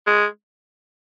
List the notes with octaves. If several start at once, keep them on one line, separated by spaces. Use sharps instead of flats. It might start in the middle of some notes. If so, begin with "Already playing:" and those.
G#3